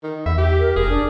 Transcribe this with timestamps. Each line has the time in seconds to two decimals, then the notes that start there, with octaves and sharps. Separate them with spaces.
0.03 D#3
0.26 E2 E5
0.38 G4
0.60 A#4
0.76 F1 G#4 A#4
0.89 D4